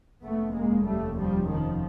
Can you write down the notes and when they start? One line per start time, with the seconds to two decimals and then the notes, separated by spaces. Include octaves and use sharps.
0.22 F1 D#2 C#3 A3 B3
0.53 G#3 A#3
0.85 G3 A3
1.16 F3 G3
1.48 D#3 F3